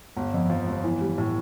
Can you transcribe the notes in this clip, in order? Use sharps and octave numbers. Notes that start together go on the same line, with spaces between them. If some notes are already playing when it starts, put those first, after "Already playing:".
G1
F2
F3
G1
E3
G3
A2